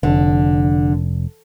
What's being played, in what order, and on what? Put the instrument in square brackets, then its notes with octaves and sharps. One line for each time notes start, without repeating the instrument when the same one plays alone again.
[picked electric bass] F1 [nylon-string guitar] D3